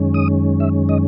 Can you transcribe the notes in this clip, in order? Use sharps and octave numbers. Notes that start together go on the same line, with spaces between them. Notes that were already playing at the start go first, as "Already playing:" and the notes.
Already playing: F#2 D#3 G#3 C#4
D#6
E5
D#5